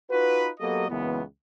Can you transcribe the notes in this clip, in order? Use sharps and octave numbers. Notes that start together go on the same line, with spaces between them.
D#4 F4 F#4 B4
F#3 A#3 B3 G4 A4 D#5
C#2 F#2 A#2 E3 B3